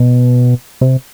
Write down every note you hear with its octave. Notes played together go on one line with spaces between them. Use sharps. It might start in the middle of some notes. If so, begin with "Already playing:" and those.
Already playing: B2
C3